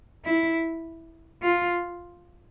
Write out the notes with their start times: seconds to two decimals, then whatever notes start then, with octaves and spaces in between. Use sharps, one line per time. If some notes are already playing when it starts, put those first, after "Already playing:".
0.25 E4
1.42 F4